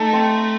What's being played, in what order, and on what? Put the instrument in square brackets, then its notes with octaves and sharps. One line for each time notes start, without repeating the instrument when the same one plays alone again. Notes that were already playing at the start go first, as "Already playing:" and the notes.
Already playing: [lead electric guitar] A3 [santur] D#4 A4 D#5
[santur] C4